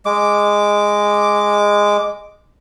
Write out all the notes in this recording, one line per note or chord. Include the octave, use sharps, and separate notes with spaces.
G#3 D6